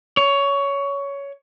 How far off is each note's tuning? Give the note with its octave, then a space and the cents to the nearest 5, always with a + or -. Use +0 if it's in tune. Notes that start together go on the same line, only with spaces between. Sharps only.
C#5 +15